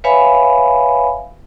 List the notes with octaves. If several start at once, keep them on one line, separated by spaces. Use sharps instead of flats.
B4 C#5 E5 F5 G#5 B5